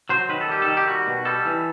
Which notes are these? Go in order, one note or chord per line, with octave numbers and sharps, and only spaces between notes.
F#3 C5
D#3 B4
A4
G3 G4
A4
D#3
G4
G3 F#4
B2
G3 A4
E3